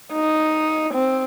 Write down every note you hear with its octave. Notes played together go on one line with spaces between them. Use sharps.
D#4
C4